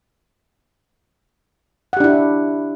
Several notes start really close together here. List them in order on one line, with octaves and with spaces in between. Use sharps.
F#5 G4 D4 E4